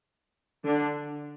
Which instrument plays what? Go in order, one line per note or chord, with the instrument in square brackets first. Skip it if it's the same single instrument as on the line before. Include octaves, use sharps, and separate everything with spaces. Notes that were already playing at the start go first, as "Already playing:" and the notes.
[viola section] D3 D4